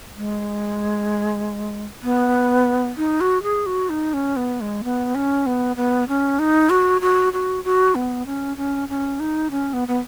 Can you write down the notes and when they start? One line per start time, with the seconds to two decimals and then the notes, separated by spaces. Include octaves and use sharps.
0.16 G#3
2.03 B3
2.97 D#4
3.21 F#4
3.43 G#4
3.66 F#4
3.90 D#4
4.14 C#4
4.36 B3
4.61 G#3
4.84 B3
5.15 C#4
5.46 B3
5.76 B3
6.08 C#4
6.39 D#4
6.70 F#4
7.01 F#4
7.33 F#4
7.64 F#4
7.95 B3
8.26 C#4
8.57 C#4
8.89 C#4
9.20 D#4
9.51 C#4
9.73 B3
9.88 B3